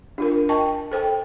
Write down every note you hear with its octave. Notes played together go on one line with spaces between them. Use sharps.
D4 F4 A#4
D#5 G5 A5 C#6
A4 C5 G5